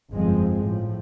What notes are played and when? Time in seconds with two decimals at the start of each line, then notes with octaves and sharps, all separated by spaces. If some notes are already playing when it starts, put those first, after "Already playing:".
0.12 G1 F2 F3 G#3 C4
0.61 A2 F3